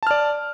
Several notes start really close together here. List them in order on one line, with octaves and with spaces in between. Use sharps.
A5 F6 D5